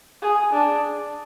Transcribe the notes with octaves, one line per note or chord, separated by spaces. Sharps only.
G#4
D4